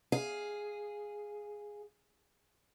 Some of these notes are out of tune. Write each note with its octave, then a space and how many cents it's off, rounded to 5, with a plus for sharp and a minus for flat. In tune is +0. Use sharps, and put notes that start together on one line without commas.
G#4 +0 F5 +0